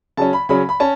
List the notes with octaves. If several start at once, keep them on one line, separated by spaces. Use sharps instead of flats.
C#3 F#3 C#4 A5
B5
C#3 F#3 C#4 B5
B5
C#4 A5